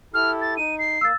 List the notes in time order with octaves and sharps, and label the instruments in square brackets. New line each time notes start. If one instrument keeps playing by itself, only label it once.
[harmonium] E4 G4 A4 [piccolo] F6
[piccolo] A6
[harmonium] D#4 [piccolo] D#7
[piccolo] C7
[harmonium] A#3 [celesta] E6 A6